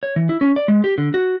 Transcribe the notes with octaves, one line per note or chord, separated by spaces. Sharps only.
C#5
E3
E4
C#4
D5
G#3
G4
D3
F#4